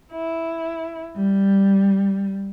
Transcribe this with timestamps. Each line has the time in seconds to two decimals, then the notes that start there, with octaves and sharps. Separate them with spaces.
0.13 E4
1.15 G3